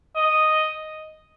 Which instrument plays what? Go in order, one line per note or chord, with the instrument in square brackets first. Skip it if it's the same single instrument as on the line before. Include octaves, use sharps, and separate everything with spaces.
[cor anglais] D#5